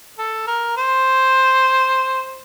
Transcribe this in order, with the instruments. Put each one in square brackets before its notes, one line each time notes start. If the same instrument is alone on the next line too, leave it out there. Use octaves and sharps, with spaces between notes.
[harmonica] A4
A#4
C5